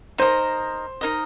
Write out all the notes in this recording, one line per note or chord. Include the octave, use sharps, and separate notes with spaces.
D#4 A#4 C5 D#5
D#4 A#4 D#5